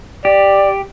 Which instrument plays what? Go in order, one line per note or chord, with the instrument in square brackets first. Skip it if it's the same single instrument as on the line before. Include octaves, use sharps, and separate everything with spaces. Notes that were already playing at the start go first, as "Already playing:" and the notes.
[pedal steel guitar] G4 [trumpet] D5